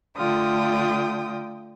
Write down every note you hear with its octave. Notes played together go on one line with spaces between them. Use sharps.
D3 A3 F4 G5 D#6